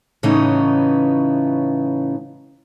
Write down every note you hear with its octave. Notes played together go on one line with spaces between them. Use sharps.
A2 C#3 E3 B3 C#4 D#4